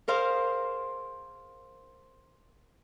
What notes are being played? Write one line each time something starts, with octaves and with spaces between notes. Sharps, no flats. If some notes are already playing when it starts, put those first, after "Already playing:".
G#4 A#4 C5 F5